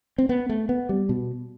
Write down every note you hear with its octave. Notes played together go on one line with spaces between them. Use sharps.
C4
B3
A3
B3
G3
B2